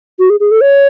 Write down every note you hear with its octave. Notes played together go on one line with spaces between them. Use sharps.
F#4
G#4
G#4
A4
C#5